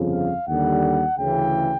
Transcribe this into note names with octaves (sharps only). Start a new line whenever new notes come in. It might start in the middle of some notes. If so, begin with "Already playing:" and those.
Already playing: G1 F2 C#3 F3
F5
D#2 D3 G3 F#5
D2 C#3 E3 G5